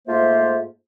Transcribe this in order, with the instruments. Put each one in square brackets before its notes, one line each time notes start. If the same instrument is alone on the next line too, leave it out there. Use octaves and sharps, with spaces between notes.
[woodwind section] G#2 A3 A#3 F4 C5 E5